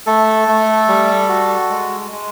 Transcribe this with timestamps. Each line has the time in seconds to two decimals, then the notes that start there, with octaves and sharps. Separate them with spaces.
0.06 A3 A4
0.48 A3
0.88 G3
1.29 F#4
1.70 G#3
2.12 G#3